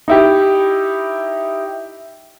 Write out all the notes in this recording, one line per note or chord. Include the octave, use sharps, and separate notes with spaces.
D#4 E4 G4